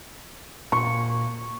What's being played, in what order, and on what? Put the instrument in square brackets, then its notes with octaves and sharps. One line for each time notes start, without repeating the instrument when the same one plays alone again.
[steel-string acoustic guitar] A#2 [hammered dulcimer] C#6